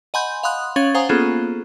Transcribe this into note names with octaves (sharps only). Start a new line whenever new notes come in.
D#5 F#5 G#5 B5 C6 G6
F5 F#5 B5 C6 D#6 F#6
C#4 C#5 F5 A6 F#7
C5 F5 F#5 G#5 A#5 D#6
A#3 B3 C#4 F4 G#4 A4